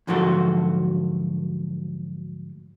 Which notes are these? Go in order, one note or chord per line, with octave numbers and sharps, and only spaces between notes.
D2 G#2 F3 F#3 F#4 A4